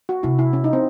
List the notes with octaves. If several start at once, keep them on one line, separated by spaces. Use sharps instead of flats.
F#4
C3 E4
E4
C#4
D#4
C4